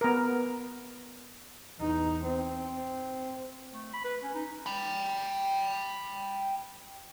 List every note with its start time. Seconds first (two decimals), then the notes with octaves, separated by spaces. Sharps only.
0.01 B3 A#4
1.79 E2 D#4
2.24 C4
3.73 A3
3.93 B5
4.05 B4
4.23 C#4
4.35 D#4
4.66 G5 B5